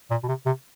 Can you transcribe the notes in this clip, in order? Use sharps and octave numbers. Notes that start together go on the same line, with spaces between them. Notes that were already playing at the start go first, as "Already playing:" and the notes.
A#2
B2
C3
C3